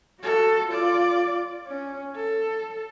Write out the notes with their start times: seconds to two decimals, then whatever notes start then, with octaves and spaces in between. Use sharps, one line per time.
0.20 F#4 A4
0.68 F4 D5
1.67 C#4
2.16 A4